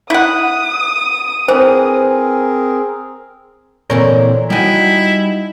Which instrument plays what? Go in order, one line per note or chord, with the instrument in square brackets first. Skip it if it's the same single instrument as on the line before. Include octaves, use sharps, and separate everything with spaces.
[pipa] E4 F#5 [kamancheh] D#6
[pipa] E3 [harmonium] C4 G#4 A#4 [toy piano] C5
[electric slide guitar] A#2 C4 A#4 [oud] D3 E3 C#5
[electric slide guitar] G3 G5 G#5 [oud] D#4 F#4 [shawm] E4